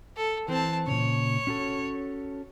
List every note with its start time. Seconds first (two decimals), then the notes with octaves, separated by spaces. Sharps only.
0.16 A4
0.48 E3 C4 A5
0.87 A#2 C#3 C#5
1.47 C#4 F#4 A4